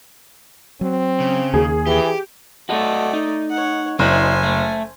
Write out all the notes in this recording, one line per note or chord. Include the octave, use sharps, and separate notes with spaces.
F#3 C4
C#3
D#2 D#3 A#3 G#4
E3 G4
A3 F#4 A4 D5 D#5
D#4
C#5 F#5
F#1 D4 E4 C5 G#5
A3